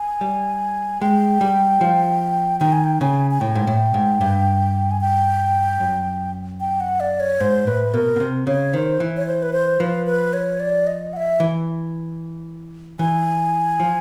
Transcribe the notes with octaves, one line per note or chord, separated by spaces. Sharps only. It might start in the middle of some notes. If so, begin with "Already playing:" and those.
Already playing: G#5
G3
G#3 G5
G3
F3
D#3 G5
G#5
G5
C#3 G#5
G#5
A2 G5
G#2
A2
G#2
G2
G#5
G5
F#2
G5
F#5
D5
C#5
G#2 C5
A2 B4
B2 A#4
B2
C3
C#3 C#5
D#3 C5
E3
C#5
C5
B4
C5
F3 B4
B4
C#5
D5
D#5
F#5
E5
E3
E3 G#5
F3